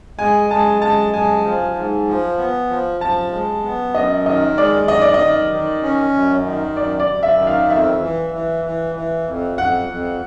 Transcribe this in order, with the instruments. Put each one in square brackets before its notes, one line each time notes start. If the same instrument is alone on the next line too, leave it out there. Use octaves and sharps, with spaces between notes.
[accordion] G#3 [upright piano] G#5
[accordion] G#3 [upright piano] A5
[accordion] G#3 [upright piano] A5
[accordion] G#3 [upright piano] G#5
[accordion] F3
G#2
F3
B3
F3
[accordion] F3 [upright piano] A5
[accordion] G#3
B3
[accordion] F#2 [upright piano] D#5
[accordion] D#3 [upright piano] D#5
[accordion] G#3 [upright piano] D5
[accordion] D#3 [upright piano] D#5
[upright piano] D5
D#5
[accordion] D#3
D#3
C#4
F#2
D#3
[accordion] F#2 [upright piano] D5
[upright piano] D5
[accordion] F#2
[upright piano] E5
[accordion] D#3
[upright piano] F5
[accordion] F2 [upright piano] E5
[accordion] E3
E3
E3
E3
F2
[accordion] F2 [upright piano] F#5
[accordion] F2